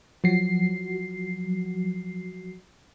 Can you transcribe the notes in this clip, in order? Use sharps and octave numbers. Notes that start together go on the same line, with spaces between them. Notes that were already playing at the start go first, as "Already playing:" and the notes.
F3 F#3 F#4 C7